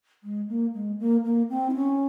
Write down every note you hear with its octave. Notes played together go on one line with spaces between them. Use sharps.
G#3
A#3
G#3
A#3
A#3
C4
E4
C#4